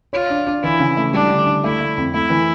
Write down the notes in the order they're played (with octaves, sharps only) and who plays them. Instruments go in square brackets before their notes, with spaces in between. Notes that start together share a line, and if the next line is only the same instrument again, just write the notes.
[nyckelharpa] F4 [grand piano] C#5
[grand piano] D4
D4
[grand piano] E3 [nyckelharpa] E4
[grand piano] C#3
A3
[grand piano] G3 [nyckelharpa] D4
[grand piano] D3
D3
[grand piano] A3 [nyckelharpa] E4
[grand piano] A3
F2
[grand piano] A3 [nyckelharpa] E4
[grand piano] E3